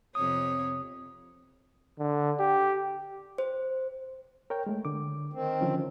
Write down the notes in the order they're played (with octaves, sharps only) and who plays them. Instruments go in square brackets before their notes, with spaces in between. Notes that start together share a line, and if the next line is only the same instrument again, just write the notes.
[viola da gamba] F2 C3 C#5 [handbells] D#6
[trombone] D3
G4
[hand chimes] C5
[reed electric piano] A#4 C#5 G5
G#3 A3
D3 D6
[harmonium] D#3 C4
[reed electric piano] D3 F3 C#4